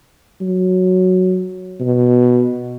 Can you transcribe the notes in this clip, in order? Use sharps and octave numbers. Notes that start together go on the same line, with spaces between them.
F#3
B2